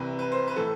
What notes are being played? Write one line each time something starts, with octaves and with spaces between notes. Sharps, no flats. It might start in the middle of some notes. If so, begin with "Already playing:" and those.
Already playing: C2 C3 E3 B4
B4
C5
B4
A2 E3 A4